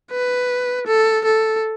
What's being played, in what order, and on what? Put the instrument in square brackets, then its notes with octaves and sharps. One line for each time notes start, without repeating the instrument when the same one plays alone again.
[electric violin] B4
A4
A4